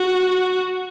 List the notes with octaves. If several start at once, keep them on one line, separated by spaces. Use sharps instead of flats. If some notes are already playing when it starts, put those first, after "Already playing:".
Already playing: F#4